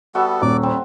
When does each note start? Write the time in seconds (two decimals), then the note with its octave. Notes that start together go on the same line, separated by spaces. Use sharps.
0.15 G3 B3 F#4 A4 E5
0.42 D#1 D5 D6
0.63 G3 C4